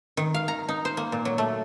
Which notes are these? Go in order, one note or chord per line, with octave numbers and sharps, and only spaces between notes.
D#3
F5
A#5
D#4
C5
A#3
A#2
F#3
A3